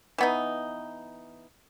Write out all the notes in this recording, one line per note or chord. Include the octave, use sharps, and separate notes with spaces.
E3 B3 D#4